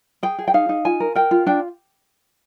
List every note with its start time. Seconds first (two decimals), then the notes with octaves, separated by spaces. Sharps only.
0.23 G#4 G5
0.39 G#4
0.48 G5
0.54 D#4 F5
0.69 D#4
0.85 F4 G#5
1.00 A#4
1.15 A#4 G5
1.31 F4
1.46 D4 G5